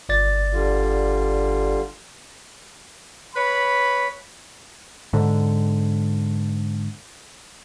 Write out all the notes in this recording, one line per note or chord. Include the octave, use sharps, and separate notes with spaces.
G1 D5 A6
D3 G3 F4
B4 C#5 B5
G#2 D3